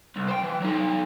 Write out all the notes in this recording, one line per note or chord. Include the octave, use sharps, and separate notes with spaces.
C2
C5 G5
E3
F#3 D#4